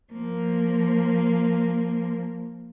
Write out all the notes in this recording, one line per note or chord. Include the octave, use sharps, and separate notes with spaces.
F3 A#3